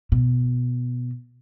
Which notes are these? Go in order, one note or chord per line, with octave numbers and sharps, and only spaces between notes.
B2